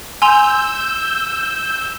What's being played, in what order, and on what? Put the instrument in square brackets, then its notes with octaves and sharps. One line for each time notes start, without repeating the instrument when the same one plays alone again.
[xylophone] G#5 C6 F7 [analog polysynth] E6 G6